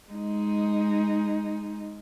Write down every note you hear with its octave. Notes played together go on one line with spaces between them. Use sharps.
G#3 D#4